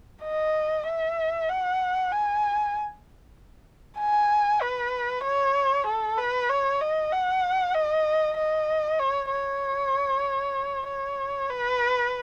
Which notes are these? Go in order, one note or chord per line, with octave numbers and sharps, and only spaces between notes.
D#5
E5
F#5
G#5
G#5
B4
C#5
A4
B4
C#5
D#5
F#5
D#5
D#5
C#5
C#5
C#5
B4